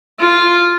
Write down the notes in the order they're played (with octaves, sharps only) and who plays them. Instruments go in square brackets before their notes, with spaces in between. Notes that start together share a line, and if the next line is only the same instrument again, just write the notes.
[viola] F4